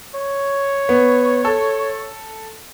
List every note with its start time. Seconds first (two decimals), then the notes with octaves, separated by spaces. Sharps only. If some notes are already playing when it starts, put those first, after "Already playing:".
0.15 C#5
0.89 B3
1.45 A4